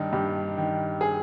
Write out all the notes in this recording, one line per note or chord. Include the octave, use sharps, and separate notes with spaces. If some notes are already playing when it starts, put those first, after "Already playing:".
Already playing: G2 D#3 D4 D#4
G2 G4
D#3
G#4